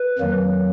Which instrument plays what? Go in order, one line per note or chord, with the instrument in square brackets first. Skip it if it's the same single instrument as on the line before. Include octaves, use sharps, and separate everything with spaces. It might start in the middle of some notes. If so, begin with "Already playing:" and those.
Already playing: [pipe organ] B4
F2 D#3 F#3 A#3